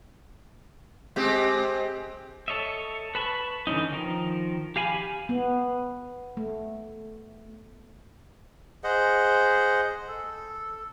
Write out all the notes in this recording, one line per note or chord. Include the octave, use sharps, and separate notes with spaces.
G#3 C4 G4
A4 C#5 D#5 E5
B4 A5 B5 C#6
D3 E3 B3 C#4 D#4
D#3 F3 A#4
G4 F5 G#5 B5
B3
A3
G#4 C5 D#5 F#5
A4